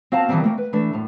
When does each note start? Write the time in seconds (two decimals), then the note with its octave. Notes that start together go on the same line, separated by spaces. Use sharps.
0.12 C4 F#4 F5 A5 A#5
0.29 D#3 E3 F#3 G3 C4
0.44 A3 A#3 G5
0.58 B4
0.73 E3 A3 D4
0.93 F#2 A2